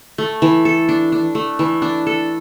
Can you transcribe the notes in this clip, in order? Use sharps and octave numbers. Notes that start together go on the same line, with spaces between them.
A3
E3
A4
D4
D4
A3
E3
D4
A4